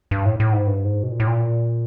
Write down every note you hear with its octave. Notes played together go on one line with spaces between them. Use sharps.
G2
A2
A2
G#2
G2
G#2
B2
A#2
A2
A#2